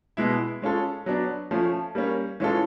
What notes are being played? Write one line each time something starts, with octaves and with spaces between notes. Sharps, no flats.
B2 G#3 B3 E4
G#3 C#4 F4 A4
F#3 B3 D4
F3 A3 C#4
G3 A#3 C#4
E3 G#3 C#4 F4 A4